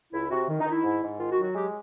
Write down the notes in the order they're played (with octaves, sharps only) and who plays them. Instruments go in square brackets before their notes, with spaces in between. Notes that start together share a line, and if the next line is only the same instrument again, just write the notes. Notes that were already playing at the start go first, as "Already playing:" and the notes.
[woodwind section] C#2 E4
C3 F#4
D#3
D#4
D#3
E4
G#2
G#2
D#3 F4
F#4
F#3
F#4
G#3 G4